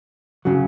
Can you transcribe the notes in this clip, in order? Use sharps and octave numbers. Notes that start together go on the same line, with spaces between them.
C#3 F#3